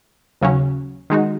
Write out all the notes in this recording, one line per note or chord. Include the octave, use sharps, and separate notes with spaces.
D#2 C#3 F#3 C#4
D#3 G#3 D#4 F#4